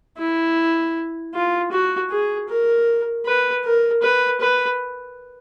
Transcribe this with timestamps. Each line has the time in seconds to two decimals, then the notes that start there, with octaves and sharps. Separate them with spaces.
0.18 E4
1.34 F4
1.72 F#4
2.10 G#4
2.48 A#4
3.26 B4
3.64 A#4
4.02 B4
4.40 B4